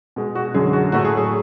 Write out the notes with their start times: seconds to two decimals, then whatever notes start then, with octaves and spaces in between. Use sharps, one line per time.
0.16 B2 G#3
0.35 F#4
0.54 F#2 D3 G#3 G#4
0.73 F#4
0.92 A2 F#3 A3 F#4
1.05 G#4
1.17 G#4